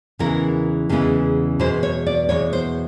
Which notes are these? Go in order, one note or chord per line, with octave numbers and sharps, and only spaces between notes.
E2 C#3 E3 G#3 B3 A#4
E2 C#3 E3 G#3 B3
E2 B2 G#3 C5
C#5
D5
E2 B2 G#3 C#5
C5